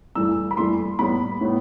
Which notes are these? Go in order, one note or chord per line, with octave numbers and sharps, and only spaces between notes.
G2 E3 A3 E6
B5
G2 E3 A3 C6
A2 G3 B3 B5
A2 G3 B3